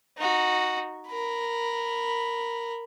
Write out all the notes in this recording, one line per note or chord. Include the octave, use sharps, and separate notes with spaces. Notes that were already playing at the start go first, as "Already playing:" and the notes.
D#4 F#4
A#4 B5